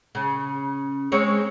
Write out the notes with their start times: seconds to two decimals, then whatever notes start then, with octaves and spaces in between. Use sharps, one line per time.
0.15 C#3
1.12 G#3 C4 C#5